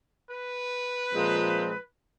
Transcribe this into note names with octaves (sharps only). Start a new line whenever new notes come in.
B4
A#2 F3 G#3 C4